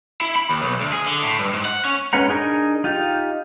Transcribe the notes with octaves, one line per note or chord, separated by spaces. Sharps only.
E4
B5
D#2
B1
D2
G#4
D3
A2
G2
G#2
F#5
C#4
G#3 C#4 B4 F#5 A#5
D4 D#4 G#4 A#4
D#4 F4 G4